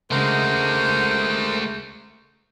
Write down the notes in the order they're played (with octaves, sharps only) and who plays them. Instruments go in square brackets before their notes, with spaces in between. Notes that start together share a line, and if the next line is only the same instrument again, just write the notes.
[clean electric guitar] C#2 C#3 G#3 [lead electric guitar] A3 F#4 [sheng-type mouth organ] A#4 C5